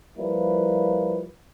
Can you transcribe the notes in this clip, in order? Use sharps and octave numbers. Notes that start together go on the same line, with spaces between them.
F3 G3 A#3 E4 B4